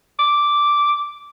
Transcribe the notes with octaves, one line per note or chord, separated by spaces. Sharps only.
D6